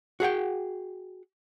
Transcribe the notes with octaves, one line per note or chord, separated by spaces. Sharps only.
F#4 G#4 F#5 G5